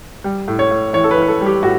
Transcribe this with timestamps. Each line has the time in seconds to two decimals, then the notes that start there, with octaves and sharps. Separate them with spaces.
0.24 G3
0.48 A2
0.59 C#5
0.71 A2
0.93 E3 C#5
1.04 A4
1.11 B4
1.17 E3
1.22 B4
1.28 A4
1.41 G3
1.46 G4
1.63 A2 F#4